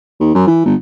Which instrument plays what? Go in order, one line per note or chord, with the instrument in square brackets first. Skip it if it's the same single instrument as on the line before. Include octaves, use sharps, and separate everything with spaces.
[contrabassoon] D#2
F#2
E3
G1